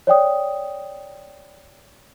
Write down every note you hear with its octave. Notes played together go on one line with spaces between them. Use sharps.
C#5 D5 G5 D#6